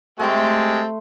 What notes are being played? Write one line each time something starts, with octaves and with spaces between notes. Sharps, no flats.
G#3 A3 C4 G4 A5 C6